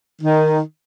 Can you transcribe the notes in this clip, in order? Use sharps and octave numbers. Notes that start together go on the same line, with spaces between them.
D#3